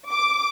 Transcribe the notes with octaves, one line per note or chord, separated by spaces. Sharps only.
D6